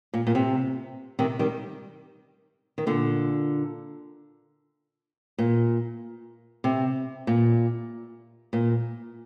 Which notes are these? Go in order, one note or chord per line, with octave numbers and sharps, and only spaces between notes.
A#2
A#2
C3
C3 D#3
D#3 G3
D#3
A#2 D3
A#2
C3
A#2
A#2